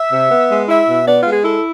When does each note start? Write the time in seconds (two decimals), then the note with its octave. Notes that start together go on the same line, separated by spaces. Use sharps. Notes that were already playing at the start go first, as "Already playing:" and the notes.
Already playing: E5
0.12 C3
0.30 B3
0.50 G#3
0.68 E4 E5
0.88 B2
1.06 B3 D5
1.20 F4
1.26 G#3
1.31 G#4
1.44 E4 A4